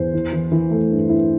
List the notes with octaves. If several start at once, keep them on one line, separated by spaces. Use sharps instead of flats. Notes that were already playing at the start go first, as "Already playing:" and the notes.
Already playing: E2 C5
E3
E3
E3
A3
G2
E4